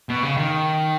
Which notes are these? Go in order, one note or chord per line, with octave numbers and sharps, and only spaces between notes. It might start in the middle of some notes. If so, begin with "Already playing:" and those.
B2
C#3
D#3